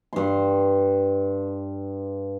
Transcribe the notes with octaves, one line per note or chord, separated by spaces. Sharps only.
G2 C6